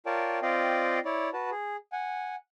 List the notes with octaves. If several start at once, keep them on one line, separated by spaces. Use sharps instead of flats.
F4 A#4 C#5 D5 G5 A5
C4 F4 D5 D#5 F5 G5
E4 C#5 D5
F#4 B4 A5
G#4
F#5 G#5